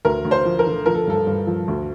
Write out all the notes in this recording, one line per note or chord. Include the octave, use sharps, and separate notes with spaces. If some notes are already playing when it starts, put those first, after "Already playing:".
D2 A#4
D2
C5
F3
A#4
D3
F3 A#4
A4
G2 A4
G2
F3
D2